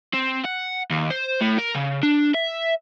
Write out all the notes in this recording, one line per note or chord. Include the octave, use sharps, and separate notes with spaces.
C4
F#5
D#2
C5
A2
A#4
C#3
D4
E5